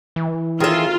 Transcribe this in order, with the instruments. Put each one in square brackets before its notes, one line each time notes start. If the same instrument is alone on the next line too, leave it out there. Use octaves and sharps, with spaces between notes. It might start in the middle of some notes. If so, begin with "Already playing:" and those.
[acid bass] E3
[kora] D#3 C4 A4 [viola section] F4 [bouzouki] G#4 E5